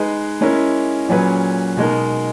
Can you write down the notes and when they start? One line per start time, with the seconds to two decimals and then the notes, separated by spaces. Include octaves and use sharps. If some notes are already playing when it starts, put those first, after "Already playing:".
Already playing: G#3 D#4 G#4 B4
0.41 G#3 C#4 E4 A#4
1.08 A#2 F#3 C#4 G#4 B4
1.77 B2 G#3 D#4 A#4